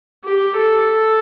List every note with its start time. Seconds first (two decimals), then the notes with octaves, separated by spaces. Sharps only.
0.24 G4
0.57 A4